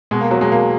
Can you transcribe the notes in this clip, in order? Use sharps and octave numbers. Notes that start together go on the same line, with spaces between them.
B2 G#3
A#3
E2 F#3
G#3
B2 A#3